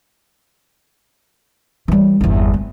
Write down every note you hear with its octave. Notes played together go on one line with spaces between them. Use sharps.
E3 G3
G1 E2
C4